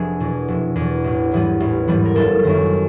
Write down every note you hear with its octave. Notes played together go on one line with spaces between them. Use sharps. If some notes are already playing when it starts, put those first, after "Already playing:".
Already playing: F1 D4 G#4 B4
E2 B2
F1
E2
B2
A1
G#2 E3 G3 B3
A1
G#2 E3 G3 B3
A#4
F#1 A4
F#2 D#3